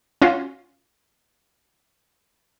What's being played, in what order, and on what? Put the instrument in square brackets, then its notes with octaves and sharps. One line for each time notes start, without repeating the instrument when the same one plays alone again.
[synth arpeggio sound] C#4 F4 F#4